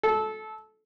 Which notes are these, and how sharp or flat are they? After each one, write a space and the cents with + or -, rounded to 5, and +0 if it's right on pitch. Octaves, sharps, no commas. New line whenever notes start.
A4 -20